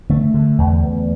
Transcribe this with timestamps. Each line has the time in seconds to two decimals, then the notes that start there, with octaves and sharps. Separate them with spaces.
0.09 D3 A3
0.34 D3
0.58 E2
0.83 E2